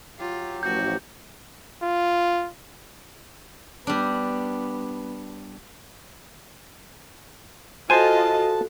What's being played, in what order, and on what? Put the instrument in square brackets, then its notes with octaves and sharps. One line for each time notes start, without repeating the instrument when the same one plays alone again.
[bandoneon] F#3 G4 [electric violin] F4
[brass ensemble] A1 F3 [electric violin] F#4 [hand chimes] G6
[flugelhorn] F4
[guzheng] G3 D4 [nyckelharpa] B3
[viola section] F4 D#5 [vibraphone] F#4 A4 [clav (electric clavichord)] C5 G#5 [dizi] A5